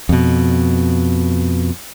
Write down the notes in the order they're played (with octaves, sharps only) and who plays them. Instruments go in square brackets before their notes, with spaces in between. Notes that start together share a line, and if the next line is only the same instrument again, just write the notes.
[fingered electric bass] F2 B2